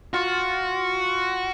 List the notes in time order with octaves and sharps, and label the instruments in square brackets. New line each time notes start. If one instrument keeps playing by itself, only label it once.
[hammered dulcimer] F4 [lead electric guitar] F#4